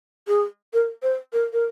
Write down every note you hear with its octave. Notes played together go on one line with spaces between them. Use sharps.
G#4
A#4
C5
A#4
A#4